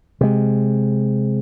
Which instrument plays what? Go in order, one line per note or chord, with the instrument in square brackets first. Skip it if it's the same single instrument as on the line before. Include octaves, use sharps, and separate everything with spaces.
[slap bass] C3 G#3